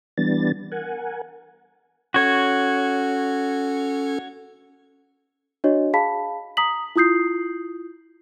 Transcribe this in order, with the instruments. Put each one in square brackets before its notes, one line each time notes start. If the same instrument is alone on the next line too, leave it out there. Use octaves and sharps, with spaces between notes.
[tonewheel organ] E3 G3 B3 D4 A6
A#4 F#5 G#5
[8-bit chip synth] C#4 A4 [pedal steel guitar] F#4 C#5
[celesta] D4 F#4 C#5 D#5
G#4 F5 A5 B5 B6
A#5 D#6 B6 F#7
E4 F4 D#6 G6 C7